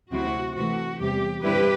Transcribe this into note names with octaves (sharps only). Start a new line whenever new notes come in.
D2 C3 F#3 C4 E4 F#4
C3 E3 A3 F#4
E2 C3 E3 G3 G4
G2 D3 G3 C4 E4 G4 B4